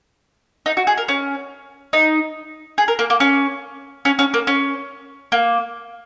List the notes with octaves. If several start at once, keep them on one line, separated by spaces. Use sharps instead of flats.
D#4
F#4
G#4
A#4
C#4
D#4
G#4
A#4
A#3
A#3
C#4
C#4
C#4
A#3
C#4
A#3